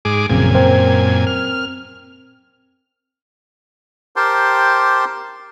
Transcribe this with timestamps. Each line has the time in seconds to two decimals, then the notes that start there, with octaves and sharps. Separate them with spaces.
0.05 G#2 G#4 D6
0.30 A#1 F#2 A#2 C#3 C4 G#5
0.55 C4 A#4 C5
1.27 F6
4.16 G4 A#4 C5 G5 A5 C6